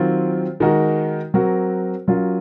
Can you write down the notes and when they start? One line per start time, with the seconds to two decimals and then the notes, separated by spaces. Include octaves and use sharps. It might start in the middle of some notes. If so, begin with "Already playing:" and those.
Already playing: D#3 F#3 C4 F4
0.60 D#3 G#3 D#4 F#4 A#4
1.34 F#3 C4 F#4 A#4
2.08 F#3 C#4 F4 A#4